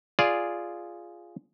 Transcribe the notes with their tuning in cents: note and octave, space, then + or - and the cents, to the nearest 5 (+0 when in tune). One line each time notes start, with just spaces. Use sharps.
F4 -5 G#4 +0 D5 -5